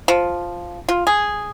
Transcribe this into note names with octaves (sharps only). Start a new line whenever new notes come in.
F3
F4
G#4